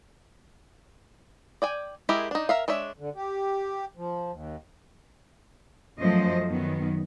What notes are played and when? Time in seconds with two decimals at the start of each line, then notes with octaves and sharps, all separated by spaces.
1.62 D5 G5 G#5
2.09 G#3 E4 G4 G#4 A#4
2.31 D4 D#4
2.49 A#4 E5 F5
2.68 G#3 D4 C#5 E5
2.99 D3
3.15 G4
3.97 F3
4.32 D#2
5.99 F#2 F3 A3 C5 D#5
6.49 F#2 D#3 F#3 B3